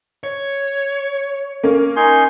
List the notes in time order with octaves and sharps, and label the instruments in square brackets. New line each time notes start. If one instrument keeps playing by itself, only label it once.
[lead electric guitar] C#5
[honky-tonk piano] A#3 C#4
[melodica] D#4 G#5 C6